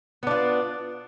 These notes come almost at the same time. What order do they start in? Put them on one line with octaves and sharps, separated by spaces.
B3 D4 F4